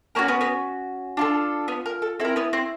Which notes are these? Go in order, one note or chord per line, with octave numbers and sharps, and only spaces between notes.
A#3 C#4 F#4 A#4
B3 B4
B3 B4
D4 F4 A4
B3 B4
A#4
A4
C4 E4 A4
A#4
B3 B4
C4 C5